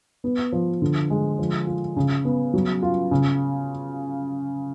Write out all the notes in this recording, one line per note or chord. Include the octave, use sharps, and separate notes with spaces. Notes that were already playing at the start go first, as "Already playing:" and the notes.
B3
F3
D3
G#3
F3
F4
C#3
B3
F#3
F4
C#3